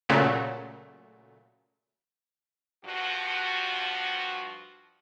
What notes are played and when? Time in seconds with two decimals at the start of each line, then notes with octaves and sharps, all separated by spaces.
0.09 A#2 C#3 F#3 A3
2.85 G2 F3 F#4